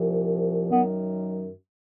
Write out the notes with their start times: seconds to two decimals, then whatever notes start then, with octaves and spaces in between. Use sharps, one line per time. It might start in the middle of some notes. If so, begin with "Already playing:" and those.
Already playing: C2 A#2 F3
0.70 F#2 D#3 F#3 B3